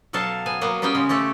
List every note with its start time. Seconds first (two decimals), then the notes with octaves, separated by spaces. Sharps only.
0.13 B2 F#3 A4 F5 A5
0.46 B3 G#5
0.61 F#3 A#3 B3
0.82 G3 B3 C#4 G#4 G5
0.95 C#3 G#3
1.09 A3 G4 A4 C#5